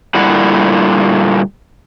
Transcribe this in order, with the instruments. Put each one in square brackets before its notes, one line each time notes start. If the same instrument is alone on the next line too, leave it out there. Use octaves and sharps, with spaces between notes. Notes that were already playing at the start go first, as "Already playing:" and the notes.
[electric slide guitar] A#2 D3 G3 E4 F#5